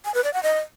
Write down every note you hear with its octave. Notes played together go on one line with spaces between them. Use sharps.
G#5
B4
D5
F#5
D#5